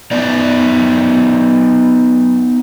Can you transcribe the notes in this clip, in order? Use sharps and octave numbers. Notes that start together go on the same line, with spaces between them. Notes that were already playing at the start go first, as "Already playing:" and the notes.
B3 D#4 D5